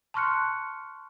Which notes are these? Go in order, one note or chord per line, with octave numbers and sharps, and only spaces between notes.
A5 C6 C#6 F6 F#6 C#7